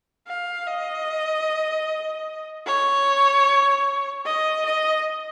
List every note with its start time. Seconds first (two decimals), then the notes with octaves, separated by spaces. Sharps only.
0.27 F5
0.66 D#5
2.66 C#5
4.25 D#5
4.65 D#5